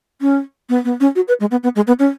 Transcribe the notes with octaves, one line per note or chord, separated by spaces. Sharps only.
C#4
B3
B3
C#4
F#4
B4
G#3
B3
B3
G#3
B3
C#4